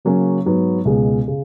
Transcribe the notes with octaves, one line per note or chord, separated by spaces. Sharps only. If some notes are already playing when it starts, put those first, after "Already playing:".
C#3 F#3 A#3 C#4
G#2 F#3 B3
C#2 B2 G#3
C#3